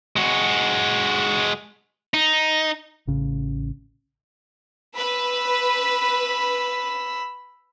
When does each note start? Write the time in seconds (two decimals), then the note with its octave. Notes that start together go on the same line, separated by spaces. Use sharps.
0.16 G#3 F#4
2.14 D#4
3.07 A1 C#3
4.97 B4 B5 E6